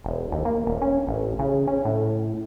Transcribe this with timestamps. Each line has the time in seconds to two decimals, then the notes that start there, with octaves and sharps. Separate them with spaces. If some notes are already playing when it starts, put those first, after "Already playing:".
0.04 E1
0.32 D#2
0.45 A#3
0.67 D#1
0.82 C#4
1.07 A1
1.39 C#3
1.68 C#4
1.85 A2